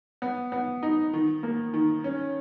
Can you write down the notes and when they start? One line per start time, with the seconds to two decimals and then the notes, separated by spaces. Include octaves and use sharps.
0.22 B3
0.52 B3
0.83 D#4
1.13 D#3
1.43 A#3
1.74 D#3
2.04 C#4